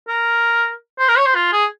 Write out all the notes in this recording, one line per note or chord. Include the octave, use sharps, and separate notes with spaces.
A#4
C5
A#4
C#5
C5
F4
G#4